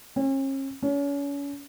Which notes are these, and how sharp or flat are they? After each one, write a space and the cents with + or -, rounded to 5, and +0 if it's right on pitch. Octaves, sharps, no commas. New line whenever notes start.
C#4 -40
C#4 +35